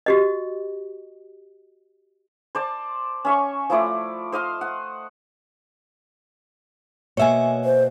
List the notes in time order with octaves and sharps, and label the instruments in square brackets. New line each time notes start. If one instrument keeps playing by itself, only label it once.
[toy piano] F#4 G4 D#5
[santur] C5 D5 A5
C#4 E5 C#6
F3 A3 E4 D5
C5 D#5 F5 C6
F#5
[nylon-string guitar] B2 A#3 [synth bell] C#5 E5 G#5
[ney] C5